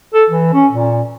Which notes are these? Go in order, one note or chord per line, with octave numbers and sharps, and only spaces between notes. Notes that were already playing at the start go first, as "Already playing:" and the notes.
A4
E3
C#4
A#2